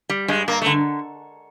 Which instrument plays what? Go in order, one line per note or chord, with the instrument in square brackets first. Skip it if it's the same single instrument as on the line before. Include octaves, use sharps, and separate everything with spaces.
[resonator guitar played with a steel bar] G3
[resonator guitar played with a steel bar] G2 [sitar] G#3
[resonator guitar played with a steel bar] G2 [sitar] A#3
[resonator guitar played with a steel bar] D3 [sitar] A3